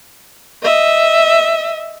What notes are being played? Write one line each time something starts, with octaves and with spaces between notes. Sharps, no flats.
D#5 E5